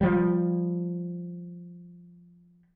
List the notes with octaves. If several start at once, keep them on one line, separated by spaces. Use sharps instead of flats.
F3 G3